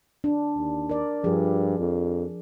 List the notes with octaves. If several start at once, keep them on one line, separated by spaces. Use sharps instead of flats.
D4
D#2
A#4 D5
G2 F3 G#4
F2